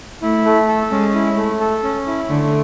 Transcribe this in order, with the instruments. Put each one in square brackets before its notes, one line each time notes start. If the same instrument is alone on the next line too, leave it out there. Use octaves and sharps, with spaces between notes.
[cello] A3 [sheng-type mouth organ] E4
[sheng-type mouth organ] A3
A4
[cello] G#3 [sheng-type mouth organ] C#4
[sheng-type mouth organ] E4
A3
A4
C#4
E4
[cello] D3 [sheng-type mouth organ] A3